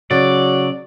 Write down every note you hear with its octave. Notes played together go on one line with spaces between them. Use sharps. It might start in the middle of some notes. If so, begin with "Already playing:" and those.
C#3 F#3 D5